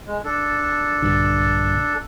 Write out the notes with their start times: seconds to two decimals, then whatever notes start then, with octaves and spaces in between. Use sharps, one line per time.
0.06 G#3
0.24 D4 A4
1.02 A#1 G2 D3